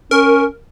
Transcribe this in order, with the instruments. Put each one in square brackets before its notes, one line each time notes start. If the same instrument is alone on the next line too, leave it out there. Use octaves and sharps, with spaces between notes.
[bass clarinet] C#4 [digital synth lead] A#4